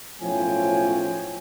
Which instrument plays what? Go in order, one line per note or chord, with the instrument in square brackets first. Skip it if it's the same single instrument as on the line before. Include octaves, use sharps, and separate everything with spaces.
[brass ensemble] B1 A2 F3 C#4 G5 G#5